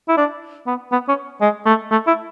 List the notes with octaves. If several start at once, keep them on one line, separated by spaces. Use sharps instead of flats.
E4
D4
B3
B3
C#4
G#3
A3
A3
E4